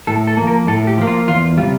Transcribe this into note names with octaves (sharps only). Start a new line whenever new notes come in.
A2 A4
A4
F3 A#3
A#4
A2 A4
G4
F3 A#3
F4
E2 F4
G3 F4
C3